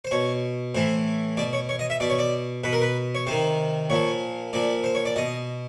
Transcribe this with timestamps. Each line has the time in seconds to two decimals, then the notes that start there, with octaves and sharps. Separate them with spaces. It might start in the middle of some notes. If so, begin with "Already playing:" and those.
0.05 C5
0.11 B2 C#5
0.75 A2 E3 C5
1.37 B2 D5
1.53 C#5
1.69 C#5
1.79 D#5
1.90 E5
2.00 B2 D5
2.10 C#5
2.19 D5
2.64 B2 B4
2.73 A#4
2.82 B4
3.15 C#5
3.27 C3 D#3 C5
3.90 A#2 F3 C#5
4.53 A#2 F3 D5
4.84 C5
4.95 C#5
5.05 D5
5.16 B2 D#5